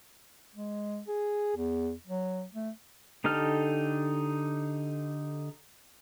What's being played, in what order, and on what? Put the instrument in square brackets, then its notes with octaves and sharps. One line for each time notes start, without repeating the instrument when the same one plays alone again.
[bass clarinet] G#3
G#4
E2
F#3
A3
[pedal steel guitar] D3 D#4 G4 A4 F6